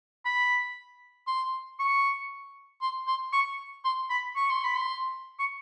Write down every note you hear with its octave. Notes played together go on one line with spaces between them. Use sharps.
B5
C6
C#6
C6
C6
C#6
C6
B5
C#6
C6
B5
C6
C#6